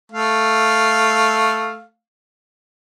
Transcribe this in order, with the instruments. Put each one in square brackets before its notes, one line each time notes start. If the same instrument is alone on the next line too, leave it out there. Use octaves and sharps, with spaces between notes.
[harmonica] A3 F5